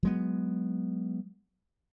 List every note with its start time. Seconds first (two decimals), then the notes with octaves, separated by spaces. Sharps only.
0.03 F#3 G#3 B3